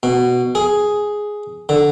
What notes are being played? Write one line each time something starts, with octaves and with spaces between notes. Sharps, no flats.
B2
G#4
D3